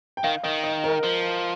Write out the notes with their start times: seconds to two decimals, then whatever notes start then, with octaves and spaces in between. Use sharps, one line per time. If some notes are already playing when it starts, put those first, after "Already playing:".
0.17 G5
0.24 D#3 F5
0.43 D#3 D#5
0.64 D#5
0.84 A#4
1.03 F3